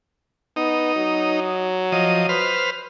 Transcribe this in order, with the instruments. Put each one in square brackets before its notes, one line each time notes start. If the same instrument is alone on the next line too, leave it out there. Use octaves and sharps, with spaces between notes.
[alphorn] B3 [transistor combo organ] D#4
[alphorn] F#3
[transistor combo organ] F3 D#5
B4 C5 F6